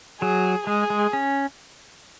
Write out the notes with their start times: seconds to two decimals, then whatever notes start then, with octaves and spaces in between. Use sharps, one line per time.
0.21 F#3 G#4
0.67 G#3 G#4
0.90 G#3
1.13 C#4